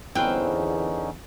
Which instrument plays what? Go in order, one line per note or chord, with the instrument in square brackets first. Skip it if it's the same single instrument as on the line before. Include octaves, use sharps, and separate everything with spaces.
[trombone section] E2 [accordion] D3 C#4 D#4 [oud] C4 [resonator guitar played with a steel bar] F4 B4 G5